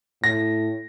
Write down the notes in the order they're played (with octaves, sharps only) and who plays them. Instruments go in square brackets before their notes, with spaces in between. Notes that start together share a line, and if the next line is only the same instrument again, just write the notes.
[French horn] A2 [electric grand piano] A#6